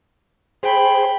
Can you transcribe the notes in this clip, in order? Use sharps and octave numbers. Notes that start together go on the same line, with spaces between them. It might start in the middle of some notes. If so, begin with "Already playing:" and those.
G#4 C5 G5 B5